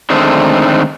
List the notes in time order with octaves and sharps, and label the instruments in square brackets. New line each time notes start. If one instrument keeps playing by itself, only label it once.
[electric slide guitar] D3 D#3 G#3 A3 C4